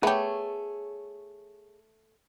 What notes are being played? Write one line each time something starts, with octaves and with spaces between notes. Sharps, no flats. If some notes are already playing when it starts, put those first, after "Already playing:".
A3 B3 G4 G#4 C#5